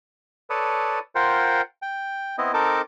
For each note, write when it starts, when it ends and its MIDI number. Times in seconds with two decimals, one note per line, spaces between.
0.50 0.99 69
0.50 0.99 71
0.50 0.99 73
0.50 0.99 74
0.50 0.99 81
0.50 0.99 87
1.15 1.61 65
1.15 1.61 70
1.15 1.61 72
1.15 1.61 78
1.15 1.61 79
1.82 2.36 79
2.38 2.52 59
2.38 2.52 60
2.38 2.52 64
2.38 2.52 75
2.54 2.82 60
2.54 2.82 63
2.54 2.82 69
2.54 2.82 70
2.54 2.82 81
2.54 2.82 86